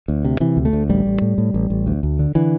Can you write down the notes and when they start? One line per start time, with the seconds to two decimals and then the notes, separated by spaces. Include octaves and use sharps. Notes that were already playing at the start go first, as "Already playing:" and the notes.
0.08 D2
0.25 C3
0.40 C3 E3
0.57 D2
0.65 A3
0.73 D2
0.89 A1 G3
1.05 A1
1.22 A2
1.38 A2
1.54 A1
1.70 A1
1.87 D2
2.03 D2
2.19 D3
2.35 D3 E3